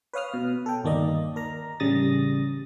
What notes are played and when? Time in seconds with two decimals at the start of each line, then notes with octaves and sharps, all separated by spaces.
0.14 B4 C#5 F5 D#6 F6
0.34 B2
0.66 A4 G5
0.84 G1 D#2 A#3 D5 D#5
1.36 A#4 A#5
1.80 A1 C#3 G3 D#6 A6 A#6